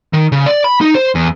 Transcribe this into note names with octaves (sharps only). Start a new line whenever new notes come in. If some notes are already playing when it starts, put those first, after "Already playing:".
D#3
C#3
D5
B5
D#4
C5
E2